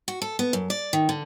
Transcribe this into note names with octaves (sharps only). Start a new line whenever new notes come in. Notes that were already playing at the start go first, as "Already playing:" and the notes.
F#4
A4
B3
F#2
D5
D#3
D3